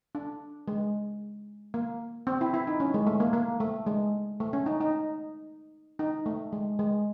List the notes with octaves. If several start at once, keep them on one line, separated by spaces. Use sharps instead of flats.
D4
G#3
A#3
C4
E4
E4
D#4
C#4
G#3
A3
A#3
A#3
A3
G#3
A3
C#4
D#4
D#4
D#4
A3
G#3
G#3